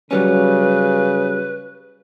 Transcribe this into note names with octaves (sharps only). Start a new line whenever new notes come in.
C#3 F#3 G3 C#4 B4